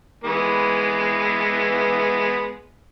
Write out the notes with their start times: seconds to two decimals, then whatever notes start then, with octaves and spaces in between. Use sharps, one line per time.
0.24 E3 G#3 B3